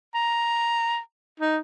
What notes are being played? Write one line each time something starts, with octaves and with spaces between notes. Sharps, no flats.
A#5
D#4